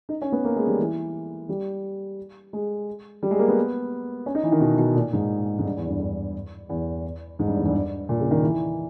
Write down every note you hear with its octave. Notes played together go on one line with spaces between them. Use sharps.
D#4
C#4
B3
A#3
G#3
G3
E3
G3
G#3
G3
G#3
A#3
B3
C#4
D#4
E3
D#3
B2
B2
A#2
G#2
G#2
G2
E2
G2
G2
E2
G#2
G2
E2
G2
A#2
C#3
D#3
E3